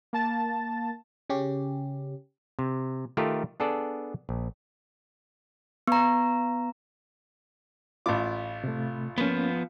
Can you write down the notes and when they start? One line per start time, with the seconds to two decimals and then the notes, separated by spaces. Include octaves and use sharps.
0.13 A#3 A5 A6
1.30 C#3 C#4 G4
2.59 C3
3.17 D#3 A3 F4 G4 A4 A#4
3.60 B3 D4 G#4 A4 D5
4.29 A#1
5.87 B3 A#5
8.06 A1 F4 B5 D6
8.64 C3 A3
9.18 F3 A#3 B3 C#4